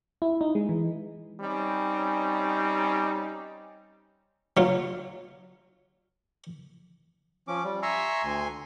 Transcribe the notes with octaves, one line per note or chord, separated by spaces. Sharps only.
E4
D#4
G#3
E3
G3 C4 C#4 D#4
F#3 F4
F3 C#4 D6
G3
E5 G#5 A#5 C6 C#6 E6
D2 G#5 C6